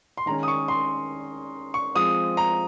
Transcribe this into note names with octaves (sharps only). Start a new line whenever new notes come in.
C6
D#3 G#3 C#4 A#5
D#6
C#6
C6
C#6
F3 G#3 C4 D#6
A#5